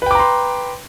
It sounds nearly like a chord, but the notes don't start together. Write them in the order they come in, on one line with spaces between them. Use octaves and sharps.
B4 G5 D6 A#5 C6